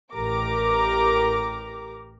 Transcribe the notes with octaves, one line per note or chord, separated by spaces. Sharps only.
A1 G4 A#4 A#5 D6